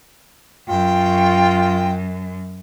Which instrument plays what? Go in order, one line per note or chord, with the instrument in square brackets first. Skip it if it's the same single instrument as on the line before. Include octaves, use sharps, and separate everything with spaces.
[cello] F#2 [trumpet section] F4 [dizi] G5